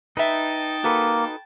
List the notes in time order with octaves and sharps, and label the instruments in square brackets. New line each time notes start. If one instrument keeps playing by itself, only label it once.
[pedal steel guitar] D#4 [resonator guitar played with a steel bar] B4 E5 [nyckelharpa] G5 A5
[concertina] A#3 [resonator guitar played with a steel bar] F#4 A4 B4